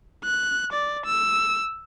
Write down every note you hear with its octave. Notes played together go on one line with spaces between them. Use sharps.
F#6
D5
E6